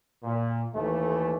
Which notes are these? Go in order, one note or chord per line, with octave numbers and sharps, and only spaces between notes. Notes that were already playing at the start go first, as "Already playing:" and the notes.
A#2
D#2 E3 A3